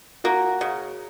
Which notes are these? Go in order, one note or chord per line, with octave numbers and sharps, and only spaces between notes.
A#3 F#4
C#3